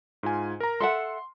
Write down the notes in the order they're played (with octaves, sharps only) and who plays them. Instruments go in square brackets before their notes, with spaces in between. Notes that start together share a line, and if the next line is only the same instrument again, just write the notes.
[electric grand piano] G#2 F4 G#5
A#4 A#5
[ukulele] A4 E5 F#5 [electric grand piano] C6